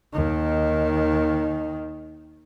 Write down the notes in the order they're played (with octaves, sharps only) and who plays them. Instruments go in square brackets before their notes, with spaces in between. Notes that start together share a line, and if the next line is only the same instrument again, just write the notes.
[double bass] D#2 D#3